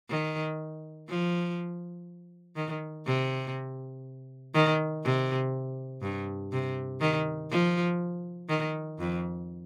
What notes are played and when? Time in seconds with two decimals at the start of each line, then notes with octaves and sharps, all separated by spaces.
0.09 D#3
1.09 F3
2.56 D#3
3.06 C3
4.54 D#3
5.04 C3
6.02 G2
6.52 C3
7.01 D#3
7.50 F3
8.49 D#3
8.99 F2